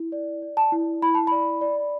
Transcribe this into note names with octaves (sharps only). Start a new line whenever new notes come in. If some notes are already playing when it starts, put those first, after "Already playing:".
Already playing: E4
D5
D5
A5
E4
E4 B5
A5
D5 B5
D5